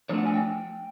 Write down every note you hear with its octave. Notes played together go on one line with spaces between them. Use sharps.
D3 F3 A3 D4 C#5 F#5
G#5
G5